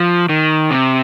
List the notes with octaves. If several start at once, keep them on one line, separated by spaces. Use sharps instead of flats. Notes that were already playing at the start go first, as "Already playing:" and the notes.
Already playing: F3
D#3
C3